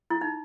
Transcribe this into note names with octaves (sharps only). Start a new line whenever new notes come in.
E4
D#4